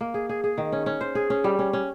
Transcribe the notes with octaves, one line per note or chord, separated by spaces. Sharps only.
A#3
G#4
G#4
G#4
D#3
C#4
C#4
C5
G#4
C#4
G3
C#4
C#4